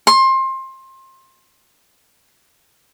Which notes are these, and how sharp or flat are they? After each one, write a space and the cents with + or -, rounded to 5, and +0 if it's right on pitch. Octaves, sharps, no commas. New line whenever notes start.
C6 +25